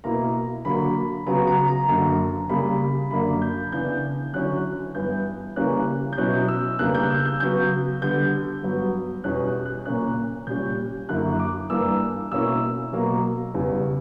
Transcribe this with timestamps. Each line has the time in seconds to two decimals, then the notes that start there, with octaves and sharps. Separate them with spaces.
0.04 B2 A#3 E4 A#5
0.65 D3 F#3 A#3 B5
1.26 C#3 F#3 B3 A#5
1.47 A#5
1.68 A#5
1.88 F#2 D3 A#3
2.49 C#3 G3 A#3 B5
3.11 F#2 D3 A#3 D4 B5
3.42 G6
3.72 C#3 E3 B3 D4 G6
4.33 D3 F#3 C#4 E4 F#6
4.95 G2 E3 B3 E4 G6
5.56 C#3 E3 G3 A#3 C#4 F#6
6.13 G6
6.17 B2 F#3 C#4 E4 F#6
6.48 E6
6.79 E2 C#3 G3 A#3 D4 F#6
6.95 G6
7.10 E6
7.25 G6
7.40 C#3 F#3 B3 G6
8.02 D3 G3 B3 G6
8.63 G2 F#3 B3
9.24 E2 B2 G3 C#4 F#6
9.65 F#6
9.86 A#2 A#3 C#4 F#6
10.47 A#2 G3 C#4 G6
11.09 F#2 D3 F#3 A#3 E4 F#6
11.39 D6
11.70 G2 E3 A#3 D4 E6
12.32 B2 A#3 C#4 E4 E6
12.92 B2 F#3 A#3
13.54 E2 C#3 G3